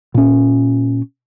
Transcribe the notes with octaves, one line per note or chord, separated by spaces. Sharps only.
A#2 C#4